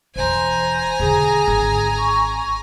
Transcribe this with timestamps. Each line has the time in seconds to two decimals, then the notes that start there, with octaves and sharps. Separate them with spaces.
0.16 E1 E3 C5 G#5 A#5
1.00 E1 D3 G#4
1.48 G#1
1.97 C#6